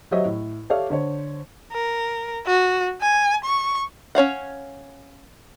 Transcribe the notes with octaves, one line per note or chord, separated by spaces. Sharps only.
F#3 G4 C5 C#5 D#5 E5
A2
G4 A4 C#5 D5 E5 F5
D3 C5 C#5
A#4
F#4
G#5
C#6
C#4 C#5 F5 F#5